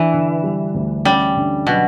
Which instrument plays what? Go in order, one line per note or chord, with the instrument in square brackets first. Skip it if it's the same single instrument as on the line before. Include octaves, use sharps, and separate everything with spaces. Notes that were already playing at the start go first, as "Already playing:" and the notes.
Already playing: [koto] E3 [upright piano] D4
[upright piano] D3
G3
D2
[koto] G3 [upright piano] C#4
[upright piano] D3
[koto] B2 [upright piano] F#3